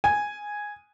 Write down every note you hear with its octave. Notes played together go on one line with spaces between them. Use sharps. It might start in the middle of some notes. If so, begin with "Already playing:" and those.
G#5